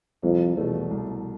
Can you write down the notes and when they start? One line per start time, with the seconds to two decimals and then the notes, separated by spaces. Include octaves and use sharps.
0.23 C2 F2
0.57 E2 B2 A3
0.90 C2